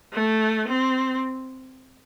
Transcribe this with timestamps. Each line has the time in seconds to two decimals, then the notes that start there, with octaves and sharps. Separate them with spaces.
0.13 A3
0.68 C4